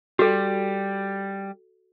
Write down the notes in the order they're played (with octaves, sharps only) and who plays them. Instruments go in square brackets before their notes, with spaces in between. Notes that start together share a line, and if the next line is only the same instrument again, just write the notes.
[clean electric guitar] G3 [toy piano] F#4 A4